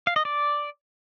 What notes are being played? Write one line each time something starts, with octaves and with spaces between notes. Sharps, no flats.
F5
D#5
D5